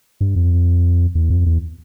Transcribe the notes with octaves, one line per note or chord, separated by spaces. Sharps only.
G2
F2
E2
F2
E2